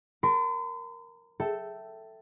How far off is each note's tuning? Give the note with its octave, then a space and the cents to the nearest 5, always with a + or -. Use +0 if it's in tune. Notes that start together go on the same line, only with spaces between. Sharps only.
A#4 +0 A5 +25 C6 -45
A4 +10 E5 +0 G5 -15